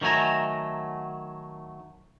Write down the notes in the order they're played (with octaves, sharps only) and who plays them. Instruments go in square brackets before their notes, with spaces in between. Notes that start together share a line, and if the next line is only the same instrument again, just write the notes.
[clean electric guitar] D#3 F#3 A3 G#5 A#5